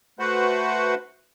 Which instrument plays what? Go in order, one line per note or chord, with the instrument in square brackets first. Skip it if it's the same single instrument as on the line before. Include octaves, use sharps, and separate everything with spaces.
[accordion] A3 F#4 B4 C5 F#5